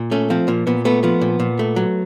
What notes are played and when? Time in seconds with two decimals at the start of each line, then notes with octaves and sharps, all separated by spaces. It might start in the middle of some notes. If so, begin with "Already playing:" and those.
Already playing: A#2
0.11 A3 C#4
0.30 F3 C4
0.48 A#2 A#3
0.67 A#2 B3
0.85 A3 B3
1.03 F3 B3
1.22 A#2
1.40 A#2
1.59 A3
1.76 F#3